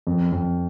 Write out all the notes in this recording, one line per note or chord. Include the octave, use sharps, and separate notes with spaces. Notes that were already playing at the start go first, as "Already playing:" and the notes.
F2
F2